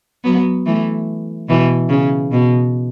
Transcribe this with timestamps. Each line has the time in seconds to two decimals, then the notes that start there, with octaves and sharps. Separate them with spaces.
0.24 F#3 B3
0.66 E3 A3
1.49 B2 E3
1.89 C#3
2.32 B2